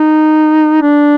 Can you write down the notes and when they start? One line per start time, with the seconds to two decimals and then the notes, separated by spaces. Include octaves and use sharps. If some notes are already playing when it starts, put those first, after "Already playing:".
Already playing: D#4
0.82 D4